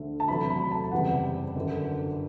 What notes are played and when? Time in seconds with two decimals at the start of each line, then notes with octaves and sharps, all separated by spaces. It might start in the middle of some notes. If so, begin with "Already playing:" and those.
Already playing: D2 D3 A3
0.20 A5
0.28 E2 C3 F#3 A3 B5
0.50 B5
0.71 A5
0.92 F#1 E2 C3 G3 F#5
1.56 G1 F#2 D3